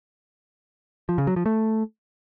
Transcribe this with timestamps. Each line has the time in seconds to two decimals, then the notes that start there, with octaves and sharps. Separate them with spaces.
1.09 F3
1.18 C#3
1.27 F#3
1.36 F3
1.46 A3